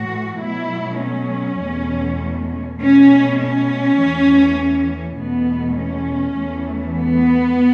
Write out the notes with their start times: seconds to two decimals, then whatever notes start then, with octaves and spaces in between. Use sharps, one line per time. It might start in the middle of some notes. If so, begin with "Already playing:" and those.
Already playing: A2 E3 A3 F#4
0.41 B2 F#3 A3 E4
1.00 C#4
1.61 E2 B2 A3
2.79 B2 A3 C#4
3.38 C#4
3.97 E2 E3 A3
5.17 E2 B2 A3 B3
5.77 C#4
6.36 E2 E3 A3
6.96 B3